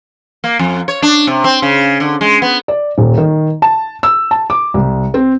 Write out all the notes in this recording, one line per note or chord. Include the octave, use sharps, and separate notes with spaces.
A#3
F2
C#5
D4
C3
C4
C#3
D3
G#3
B3
D5
D#1
D#3
A5
E6
A5
D6
C2
C4